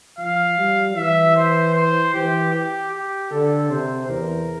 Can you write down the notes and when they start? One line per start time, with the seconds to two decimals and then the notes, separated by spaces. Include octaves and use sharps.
0.19 F3 F5
0.58 G3
0.96 E3 E5
1.36 C5
1.74 C5
2.13 E3 G4
2.53 G4
2.92 G4
3.31 D3 A4
3.69 C3 C5
4.08 E2 A#4